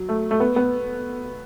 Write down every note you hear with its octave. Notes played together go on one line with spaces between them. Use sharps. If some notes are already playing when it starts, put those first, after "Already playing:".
Already playing: F#3
A3
A3
B3
B3